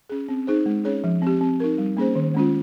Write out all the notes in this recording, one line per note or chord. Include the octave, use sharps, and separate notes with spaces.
C#4 G#4
C4
D#4 G#4 C5
G#3
C#4 G#4 C#5
F3
C4 G4
C4
D#4 A#4
G3
A#3 C#4 G#4 C5
D#3
G#3 C#4 F4